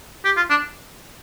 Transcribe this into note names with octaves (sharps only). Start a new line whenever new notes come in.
G4
F4
D4